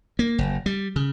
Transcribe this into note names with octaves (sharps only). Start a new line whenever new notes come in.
A#3
F#1
G3
C#3